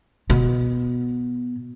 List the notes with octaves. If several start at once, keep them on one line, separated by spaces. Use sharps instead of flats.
B2